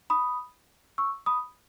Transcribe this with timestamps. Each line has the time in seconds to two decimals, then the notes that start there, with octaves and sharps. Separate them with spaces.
0.10 B5 D#6
0.98 C#6 E6
1.26 B5 D#6